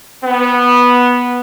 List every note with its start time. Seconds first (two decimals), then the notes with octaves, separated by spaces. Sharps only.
0.22 B3